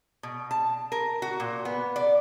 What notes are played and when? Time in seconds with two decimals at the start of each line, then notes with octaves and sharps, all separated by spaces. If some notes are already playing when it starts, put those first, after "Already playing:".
0.23 B2
0.51 A5
0.92 A#4
1.22 F#4
1.40 A#2
1.65 B3
1.96 D5